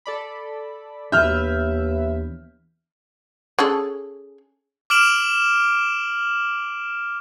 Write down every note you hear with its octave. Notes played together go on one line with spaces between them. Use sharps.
A4 D5 B5
D#2 E3 B3 D4 B4 E5 F6 G6
C#4 G#4 A4
D6 F6 D7 E7 F#7